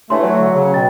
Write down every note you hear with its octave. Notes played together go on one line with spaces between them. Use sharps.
G2 E3 A3 C#5 C6
F#3
D3
C#3
B2 G5 A6